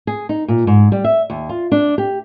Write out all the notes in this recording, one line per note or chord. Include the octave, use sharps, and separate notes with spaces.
G#4
D#4
A#2
G#2
G3
E5
D#2
F4
D4
G4